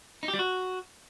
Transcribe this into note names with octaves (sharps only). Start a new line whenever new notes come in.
D#4
G4
G3
F#4